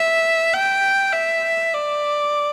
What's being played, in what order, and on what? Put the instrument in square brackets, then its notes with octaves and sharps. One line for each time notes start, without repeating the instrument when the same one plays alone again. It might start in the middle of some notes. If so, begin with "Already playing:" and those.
Already playing: [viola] E5
G5
E5
D5